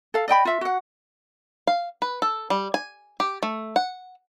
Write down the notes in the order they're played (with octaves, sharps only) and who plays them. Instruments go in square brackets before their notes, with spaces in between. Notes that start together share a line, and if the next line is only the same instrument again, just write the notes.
[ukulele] A4 F5
D5 D#5 G5 B5
F4 E5
F#4 F#5
[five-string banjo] F5
B4
A4
G3
G#5
G4
A3
F#5